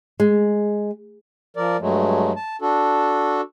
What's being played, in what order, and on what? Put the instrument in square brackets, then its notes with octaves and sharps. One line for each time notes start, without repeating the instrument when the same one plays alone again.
[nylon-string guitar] G#3
[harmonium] F3 A#4 D5
G2 F#3 G#3 A3
A5
D4 F#4 A4